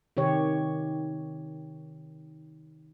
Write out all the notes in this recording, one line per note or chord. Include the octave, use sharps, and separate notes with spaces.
C3 D#3 G4 C#5